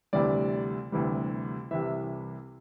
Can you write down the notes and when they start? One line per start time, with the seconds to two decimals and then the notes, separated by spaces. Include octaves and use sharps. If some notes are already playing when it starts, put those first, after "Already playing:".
0.13 D2 C3 E3 G3 D5
0.92 D2 C3 E3 G3
1.71 C2 C3 E3 E5